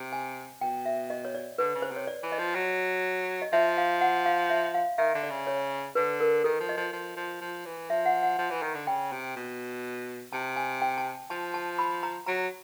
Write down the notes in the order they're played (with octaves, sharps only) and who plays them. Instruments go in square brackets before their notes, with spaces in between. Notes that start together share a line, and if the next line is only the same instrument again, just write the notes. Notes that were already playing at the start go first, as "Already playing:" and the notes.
Already playing: [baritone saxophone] C3
[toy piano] G#5
[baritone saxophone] B2 [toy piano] G5
[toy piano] E5
D#5
C#5
D5
[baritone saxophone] D3 [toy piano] B4
[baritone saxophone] C#3
[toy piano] C5
[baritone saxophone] C3 [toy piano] C#5
[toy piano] D5
[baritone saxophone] E3
[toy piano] D#5
[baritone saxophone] F3
F#3
[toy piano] D#5
[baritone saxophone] F3 [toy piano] E5
[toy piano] F5
F#5
F5
E5
F5
[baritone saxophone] D#3 [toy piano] E5
[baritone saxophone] D3
[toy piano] D5
[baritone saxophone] C#3
[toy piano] C#5
[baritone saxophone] D3 [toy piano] B4
[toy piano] A#4
[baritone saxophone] D#3 [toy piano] A4
[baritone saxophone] F3
[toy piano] D#5
[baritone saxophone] F3
F3
F3
F3
E3
[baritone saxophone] F3 [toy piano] E5
[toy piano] F#5
F#5
[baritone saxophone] F3
E3
D#3
D3
[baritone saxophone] C#3 [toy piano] G5
[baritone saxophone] C3
B2
[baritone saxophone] C3 [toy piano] A5
[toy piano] G#5
G5
A5
[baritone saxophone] F3 [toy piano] A5
[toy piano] A5
B5
A#5
[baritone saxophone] F#3 [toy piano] A#5